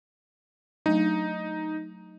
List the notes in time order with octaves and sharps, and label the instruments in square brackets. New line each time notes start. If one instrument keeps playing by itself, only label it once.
[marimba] F#3 A3 D4 [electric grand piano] D#4